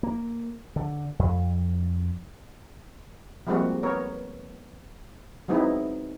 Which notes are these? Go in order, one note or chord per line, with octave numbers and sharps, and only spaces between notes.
A#3
D3
F2
F3 G3 G#3 A#3 C4 F#4
B3 A#4 C#5
F#3 G#3 B3 C4 D#4 E4